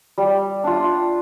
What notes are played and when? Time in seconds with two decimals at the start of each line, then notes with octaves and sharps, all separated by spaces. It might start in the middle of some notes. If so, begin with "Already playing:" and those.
0.18 G3
0.64 D4 F4